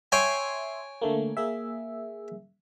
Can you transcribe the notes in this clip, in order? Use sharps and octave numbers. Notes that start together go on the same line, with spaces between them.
C#5 E5 G5 G#5 C6
D3 A3 A#3
A#3 G#4 E5